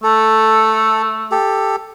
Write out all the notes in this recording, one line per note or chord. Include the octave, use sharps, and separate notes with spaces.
A3 A4
G4 A4